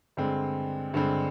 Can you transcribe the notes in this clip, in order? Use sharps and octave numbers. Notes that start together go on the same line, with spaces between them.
G2 D3 G#3 C4
G2 D3 G#3 C4